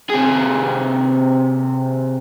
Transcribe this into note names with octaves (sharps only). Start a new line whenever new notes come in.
C3 G#4